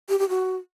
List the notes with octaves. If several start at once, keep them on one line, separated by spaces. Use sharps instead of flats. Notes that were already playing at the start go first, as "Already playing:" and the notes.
G4
G4
F#4